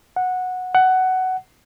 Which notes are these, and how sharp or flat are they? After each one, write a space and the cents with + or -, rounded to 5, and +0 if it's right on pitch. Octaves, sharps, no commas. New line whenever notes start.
F#5 -10
F#5 +15